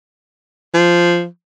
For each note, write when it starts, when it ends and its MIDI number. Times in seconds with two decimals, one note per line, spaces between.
0.74 1.25 53